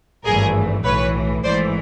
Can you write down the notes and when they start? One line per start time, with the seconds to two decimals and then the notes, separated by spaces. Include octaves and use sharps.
0.25 G#1 G2 E3 A3 G#4 A#4
0.84 B1 A2 E3 B4 C#5
1.44 G#1 G#2 E3 A3 C5 D5